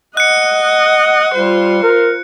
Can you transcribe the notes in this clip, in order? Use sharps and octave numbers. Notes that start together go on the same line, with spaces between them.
D#5 F#5 F#6 C#7
G3 F4 C5
A#4